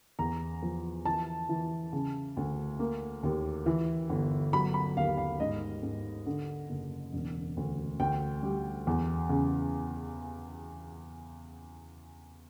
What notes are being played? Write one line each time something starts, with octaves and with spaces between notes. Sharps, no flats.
E2 A#5
F3
E3 A5
E3
C#3
D2
A#3
D#2
E3
G1
F#3 B5
B5
D#2 F5
F5
G#2 D#5
G#2
D3
F#1
E1
D2
D2 G5
G3
E2
C#3